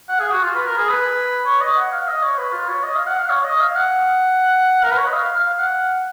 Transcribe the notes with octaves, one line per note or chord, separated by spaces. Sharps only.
F#5
G#4
F#4
F4
B4
A#4
G#4
B4
C#5
D#5
F#5
F5
D#5
C#5
B4
F4
C#5
D#5
F5
F#5
F5
C#5
D#5
F5
F#5
A#4
B4
C#5
D#5
F5
F5
F#5